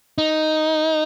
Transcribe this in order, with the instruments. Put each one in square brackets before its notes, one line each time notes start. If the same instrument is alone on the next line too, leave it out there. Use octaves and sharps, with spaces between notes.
[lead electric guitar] D#4